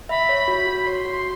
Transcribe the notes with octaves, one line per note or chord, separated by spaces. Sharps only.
E5 B5
C#5
F#4
F#4
B5
C#5 C6
F#4